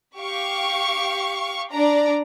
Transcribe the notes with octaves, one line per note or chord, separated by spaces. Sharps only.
G4 F5 C#6
D4 D5 A#5